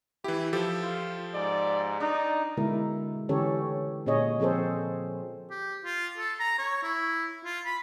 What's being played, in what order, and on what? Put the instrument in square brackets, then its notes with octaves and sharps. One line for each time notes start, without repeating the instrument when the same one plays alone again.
[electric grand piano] E3 G4 [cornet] E4
[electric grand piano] F3 G4 A4
[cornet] F4
[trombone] G#2 [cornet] D5
[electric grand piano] D4 [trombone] D#4 [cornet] D5
[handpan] B2 D3 G#3 E4 A#4
D3 E3 C#4 G4 A4 C#5
A#2 C#4 G#4 C#5 D#5
F3 C4 G#4 A4 C5
[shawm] G4
F4
A4
A#5
C#5
E4
F4
B5